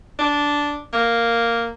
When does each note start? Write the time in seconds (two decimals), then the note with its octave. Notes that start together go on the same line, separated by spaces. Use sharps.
0.19 D4
0.93 A#3